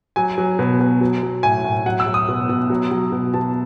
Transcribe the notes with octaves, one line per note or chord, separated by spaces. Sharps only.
F#3 G#5
F#3
B2
B2
F#3
F#3
A2 G#5
A2
F#3 F#5
E6
F#3
D#6
B2
B2
F#3
F#3
B2
B2 A5